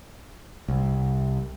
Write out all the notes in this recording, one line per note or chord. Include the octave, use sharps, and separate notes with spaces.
C2